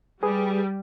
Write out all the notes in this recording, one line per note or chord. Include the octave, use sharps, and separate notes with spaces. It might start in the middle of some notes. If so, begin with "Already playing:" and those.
G3 G#4 B4 D#6